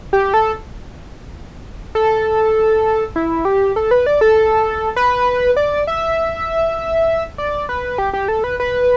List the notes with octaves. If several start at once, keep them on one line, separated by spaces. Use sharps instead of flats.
G4
A4
A4
E4
G4
A4
B4
D5
A4
B4
D5
E5
D5
B4
G4
G4
A4
B4
B4